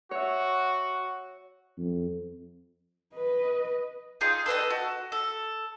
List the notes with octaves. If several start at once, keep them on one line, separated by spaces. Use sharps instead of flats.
F#4 C#5 E5
F2
B4 D#5
D#4 F4 G#4
A4 B4 C5 D#5
F#4
A4